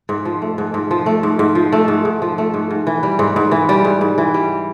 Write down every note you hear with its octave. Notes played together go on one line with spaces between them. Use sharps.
G#2
F3
A3
G#2
G#2
F3
A3
G#2
G#2
F3
A3
G#2
G#2
F3
A3
G#2
G#2
E3
G3
G#2
G#2
E3
G3
G#2
G#2
E3
G3